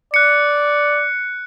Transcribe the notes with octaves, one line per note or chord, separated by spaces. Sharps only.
D5 F#6 C#7